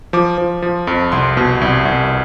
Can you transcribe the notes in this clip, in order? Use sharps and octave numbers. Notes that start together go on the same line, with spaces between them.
F3 D6
F3
F3
F2
C2 C6
B2
C2
C2